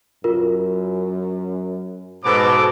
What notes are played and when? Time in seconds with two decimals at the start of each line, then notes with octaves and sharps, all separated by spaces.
0.24 F#2 F4 A#4
2.25 G#2 B2 A4 C5 D6